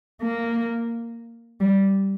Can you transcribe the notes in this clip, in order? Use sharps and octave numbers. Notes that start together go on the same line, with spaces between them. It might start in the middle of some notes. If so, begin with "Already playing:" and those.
A#3
G3